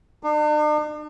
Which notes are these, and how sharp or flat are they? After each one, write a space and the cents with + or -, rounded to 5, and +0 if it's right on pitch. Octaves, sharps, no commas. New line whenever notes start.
D4 +45